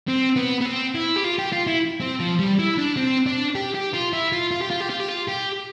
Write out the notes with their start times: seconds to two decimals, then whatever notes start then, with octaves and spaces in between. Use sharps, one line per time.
0.08 C4
0.36 B3
0.61 B3
0.65 C4
0.95 E4
1.16 G4
1.24 F4
1.38 G4
1.52 F4
1.67 E4
2.01 C4
2.20 F3
2.39 G3
2.59 E4
2.78 D4
2.97 C4
3.26 D4
3.55 G4
3.74 G4
3.93 F4
4.13 E4
4.33 F4
4.52 F4
4.62 G4
4.70 F4
4.81 G4
4.90 F4
5.00 G4
5.09 F4
5.29 G4